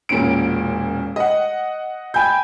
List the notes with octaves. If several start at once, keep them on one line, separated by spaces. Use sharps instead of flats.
E1 A#2 C#4 D7
D#5 F#5
G5 G#5 B5 G6